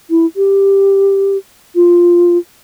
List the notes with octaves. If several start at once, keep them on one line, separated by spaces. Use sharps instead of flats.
E4
G4
F4